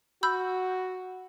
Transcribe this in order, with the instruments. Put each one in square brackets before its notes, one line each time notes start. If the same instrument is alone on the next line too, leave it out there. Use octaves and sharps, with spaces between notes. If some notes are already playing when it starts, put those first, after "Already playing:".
[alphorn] F#4 [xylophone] B5 E6 G6